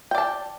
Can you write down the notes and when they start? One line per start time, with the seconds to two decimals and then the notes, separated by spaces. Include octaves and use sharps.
0.11 G5
0.15 D5
0.18 A5